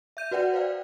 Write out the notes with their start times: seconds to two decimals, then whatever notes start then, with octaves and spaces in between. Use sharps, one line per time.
0.17 E5 G6 D#7
0.31 F#4 B4 D5 F#5 G5
0.54 C5 D5 F5 G5